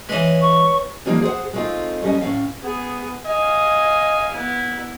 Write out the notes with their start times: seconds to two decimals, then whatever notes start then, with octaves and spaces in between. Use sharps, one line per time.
0.09 E3 G#3 B4 C#5
0.41 C#6
1.05 D3 E3 F3 G3 A#3 D#4
1.22 G#4 C5 C#5 F#5
1.53 G#3 A3 C4 C#4 D#4 F4
2.03 D#2 G3 C#4 D#5 G#5
2.21 A2 A#3 C#4 F5
2.63 B3 G#4
3.27 D#5 F5 G#5
4.31 B3 E4